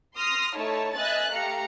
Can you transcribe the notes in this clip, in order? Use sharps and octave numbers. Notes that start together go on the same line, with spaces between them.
C6 D#6 F6 A#6
A3 D#4 E4 C#5 A5
B4 D#5 E5 G#5 F#6 A6
A3 G4 F5 A#5 C#7